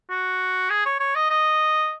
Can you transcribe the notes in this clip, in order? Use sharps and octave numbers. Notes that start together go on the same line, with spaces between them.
F#4
G#4
C#5
C#5
D#5
D#5